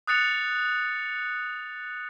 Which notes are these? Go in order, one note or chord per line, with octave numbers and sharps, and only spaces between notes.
D#6 F#6 A6 C#7 F7